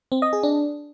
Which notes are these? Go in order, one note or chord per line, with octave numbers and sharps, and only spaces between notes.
C4
D#5
G#4
D4